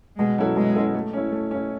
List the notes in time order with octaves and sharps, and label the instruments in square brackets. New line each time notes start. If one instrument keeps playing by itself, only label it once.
[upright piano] B2 [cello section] G#3
[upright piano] F#3 C#4 E4 A4
[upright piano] B2 [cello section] G#3
[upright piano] F#3 C#4 E4 A4
A3
C#4 E4
A3
C#4 E4